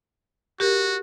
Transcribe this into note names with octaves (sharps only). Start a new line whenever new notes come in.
F#4 G4 A#4